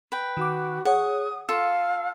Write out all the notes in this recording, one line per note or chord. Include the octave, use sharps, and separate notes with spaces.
B4 G5
D#3 F#4 D6
G#4 C#5 F#5 D#6
F4 A4 F5 E6